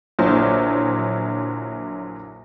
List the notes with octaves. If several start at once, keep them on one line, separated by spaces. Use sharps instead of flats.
A#1 A#2 D3 F#3 E4 C5